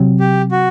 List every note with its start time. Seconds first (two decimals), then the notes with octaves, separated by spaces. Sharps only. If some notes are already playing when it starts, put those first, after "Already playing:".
Already playing: C3 F#3 C4
0.20 G4
0.51 F#4